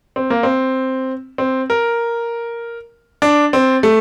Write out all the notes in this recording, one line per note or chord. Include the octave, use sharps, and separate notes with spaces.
C4
A#3
C4
C4
A#4
D4
C4
A3